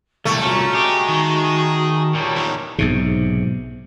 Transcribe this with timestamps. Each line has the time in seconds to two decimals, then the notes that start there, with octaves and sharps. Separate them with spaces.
0.25 C2 A#2 A3 E4
0.42 C#4 F#4 A#5 C#6
0.75 G4 G#4 D#5
1.08 D#3
2.15 A#2 G3 C#5 A5 C#6
2.36 E2 D#3
2.78 B1 G#2 C3